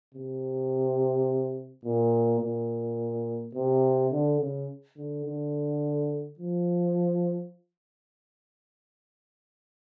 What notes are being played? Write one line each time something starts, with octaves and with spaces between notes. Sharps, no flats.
C3
A#2
A#2
C3
D3
C#3
D3
D3
F3